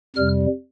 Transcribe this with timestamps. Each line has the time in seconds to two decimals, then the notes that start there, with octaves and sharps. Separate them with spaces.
0.16 F2 C3 G3 F6